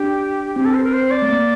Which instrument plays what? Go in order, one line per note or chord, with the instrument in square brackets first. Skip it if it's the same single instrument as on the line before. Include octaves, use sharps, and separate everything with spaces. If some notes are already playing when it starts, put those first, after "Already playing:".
Already playing: [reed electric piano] D4 [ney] G4
[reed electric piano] C4 [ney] G4
[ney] A4
C5
A#4
C5
D5
[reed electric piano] A3
A#3